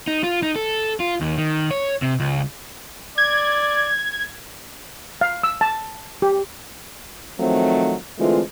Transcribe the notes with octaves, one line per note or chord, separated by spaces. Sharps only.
D#4
F4
D#4
A4
F4
D#2
D#3
C#5
C3
C#2
D5 G#6
F5
E6
A5
G4
D#3 F3 F#3 A3 C4
D3 E3 G#3 A3 C4 F4